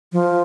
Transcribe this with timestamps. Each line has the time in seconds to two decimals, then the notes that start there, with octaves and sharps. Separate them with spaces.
0.12 F3